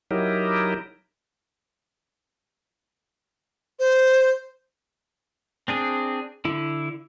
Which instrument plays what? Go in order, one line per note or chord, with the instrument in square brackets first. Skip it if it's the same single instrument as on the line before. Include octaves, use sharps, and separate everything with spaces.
[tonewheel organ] F#3 D#4 E4 G4 A#4
[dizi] C5
[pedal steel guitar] C4 D4 G#4
D3 E4